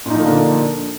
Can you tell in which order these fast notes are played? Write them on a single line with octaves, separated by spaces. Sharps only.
A#2 D#4 F3 A#3 D3